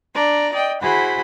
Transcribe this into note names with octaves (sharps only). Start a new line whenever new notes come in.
D4 D5 A#5
D5 D#5 G5
E4 F#4 G#4 C5 F#5 B5